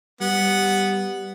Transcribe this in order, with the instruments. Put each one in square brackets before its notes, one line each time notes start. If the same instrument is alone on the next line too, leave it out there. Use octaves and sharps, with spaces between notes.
[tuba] G3 [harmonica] B3 F#5